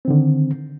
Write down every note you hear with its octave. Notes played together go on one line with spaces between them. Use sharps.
D3 D#3 C4